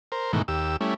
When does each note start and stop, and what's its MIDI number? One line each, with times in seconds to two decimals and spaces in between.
0.12 0.32 70
0.12 0.32 72
0.33 0.42 44
0.33 0.42 47
0.33 0.42 51
0.33 0.42 52
0.33 0.42 57
0.48 0.77 39
0.48 0.77 67
0.48 0.77 88
0.81 0.94 55
0.81 0.94 57
0.81 0.94 61
0.81 0.94 64